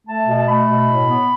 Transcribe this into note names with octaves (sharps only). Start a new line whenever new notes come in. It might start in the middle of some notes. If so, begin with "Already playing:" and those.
A3 A5
B2
A5
A3 B5
B2
A2
B3